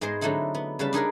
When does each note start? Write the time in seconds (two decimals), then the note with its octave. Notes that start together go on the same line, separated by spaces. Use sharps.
0.01 G#2 G#3 B3 G#4 C5 D#5
0.21 D3 F#3 A3 C4 D#4 E4
0.54 B3
0.79 C#3 G3 B4 A5
0.93 D4 D#4 G#4 A#4 B4